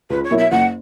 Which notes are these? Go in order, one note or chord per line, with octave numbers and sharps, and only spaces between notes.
C#2 B4
C#5
B2 F#3 A#3 E4
E5
F#1 F#5